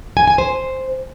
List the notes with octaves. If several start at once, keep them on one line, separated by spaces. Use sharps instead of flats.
G#5
G#5
C5